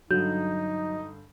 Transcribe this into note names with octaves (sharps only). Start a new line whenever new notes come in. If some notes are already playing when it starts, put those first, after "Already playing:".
G2 D3 F#3 D#4 G6